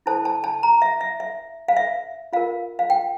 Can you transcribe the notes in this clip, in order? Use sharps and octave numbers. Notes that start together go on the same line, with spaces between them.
E4 A4 C5 A5
A5
A5
A#5
E5
E5
E5
F5
E5
F4 A#4 F5
F5
G5